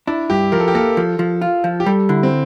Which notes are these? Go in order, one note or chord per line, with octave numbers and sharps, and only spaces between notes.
D4 E4
G2 G4
F3 A#4
A4
G4
A#3 A4
F3
F3
F4
F3
G4
G3 A4
D3 E4
C4